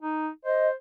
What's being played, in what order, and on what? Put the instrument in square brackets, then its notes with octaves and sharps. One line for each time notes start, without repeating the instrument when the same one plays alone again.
[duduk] D#4
[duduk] C5 [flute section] D#5